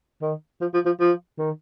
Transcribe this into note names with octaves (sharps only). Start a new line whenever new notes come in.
D#3
F3
F3
F3
F3
D#3